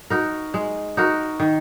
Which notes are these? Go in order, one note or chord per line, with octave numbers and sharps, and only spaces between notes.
D#4 F#4 A#4
G#3
D#4 F#4 A#4
D#3